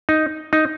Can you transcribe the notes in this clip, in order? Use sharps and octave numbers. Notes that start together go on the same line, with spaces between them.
D#4
D#4